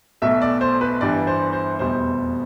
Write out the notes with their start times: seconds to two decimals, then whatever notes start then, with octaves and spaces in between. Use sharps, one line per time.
0.22 B1 B2 A3 E5
0.42 D5
0.61 C5
0.81 B4
1.01 G1 G2 E3 G3 D4 D5
1.27 C5
1.53 C5
1.79 F1 E2 B2 G3 C5